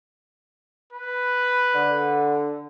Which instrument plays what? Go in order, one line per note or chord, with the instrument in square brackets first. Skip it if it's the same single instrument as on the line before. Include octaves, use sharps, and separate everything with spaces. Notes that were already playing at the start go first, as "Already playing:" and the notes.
[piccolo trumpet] B4
[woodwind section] D3